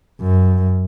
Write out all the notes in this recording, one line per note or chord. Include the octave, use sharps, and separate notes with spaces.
F#2